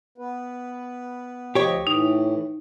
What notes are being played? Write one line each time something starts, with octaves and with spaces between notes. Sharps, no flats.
B3 B4
D2 F3 G4 C#5 D#5
A2 E3 D#4